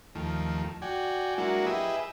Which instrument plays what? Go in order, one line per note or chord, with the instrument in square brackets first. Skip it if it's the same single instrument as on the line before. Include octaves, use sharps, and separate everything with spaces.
[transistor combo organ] D#2 D#3 F3 A3
F#4 D5 G5 G#5
F#3 G#3 A#3 D4 E4 F#4
E4 G4 G#4 B4 D#5 E5